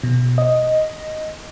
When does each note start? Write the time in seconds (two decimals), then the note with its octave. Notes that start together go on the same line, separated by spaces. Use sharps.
0.04 B2
0.38 D#5